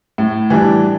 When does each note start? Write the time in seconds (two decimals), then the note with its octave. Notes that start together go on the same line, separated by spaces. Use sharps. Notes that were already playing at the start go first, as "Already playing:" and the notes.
0.18 A2
0.50 E3 G3 D4